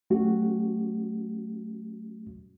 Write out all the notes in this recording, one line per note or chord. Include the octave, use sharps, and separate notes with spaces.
F#3 A3 C#4 F#4 G4